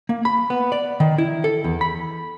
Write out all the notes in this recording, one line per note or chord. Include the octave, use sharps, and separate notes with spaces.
A#3
B5
B3
D5
D#3
E4
A4
E2
B5